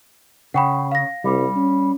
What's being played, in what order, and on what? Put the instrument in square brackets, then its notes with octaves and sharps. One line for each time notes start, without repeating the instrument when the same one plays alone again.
[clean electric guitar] C#3 [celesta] F#5 G5 B5
[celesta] F5 A#6
[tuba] C2 [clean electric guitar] G3
[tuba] C#4